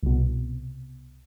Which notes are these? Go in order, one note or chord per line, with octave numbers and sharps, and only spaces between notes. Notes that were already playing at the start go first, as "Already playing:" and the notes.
C2 B2